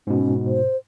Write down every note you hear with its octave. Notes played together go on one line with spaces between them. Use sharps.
G#2 B2 C#4
C5